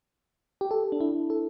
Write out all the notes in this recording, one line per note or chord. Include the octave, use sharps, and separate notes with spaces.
G4
A4
D4
E4
A4